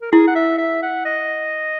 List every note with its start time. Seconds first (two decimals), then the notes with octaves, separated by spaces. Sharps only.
0.01 A#4
0.12 E4 G#4
0.27 F#5
0.35 E5
0.58 E5
0.82 F#5
1.05 D#5